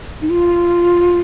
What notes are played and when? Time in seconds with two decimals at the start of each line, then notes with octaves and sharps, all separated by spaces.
0.22 D#4
0.30 F4